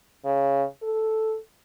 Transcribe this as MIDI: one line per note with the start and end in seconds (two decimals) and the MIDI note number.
0.25 0.63 49
0.82 1.36 69